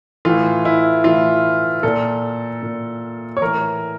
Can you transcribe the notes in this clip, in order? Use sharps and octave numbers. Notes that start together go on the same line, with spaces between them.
A2 E3 F4
E4
A2 E3 F4
A#2 A4
A#2
C#5
A2 E3 A#4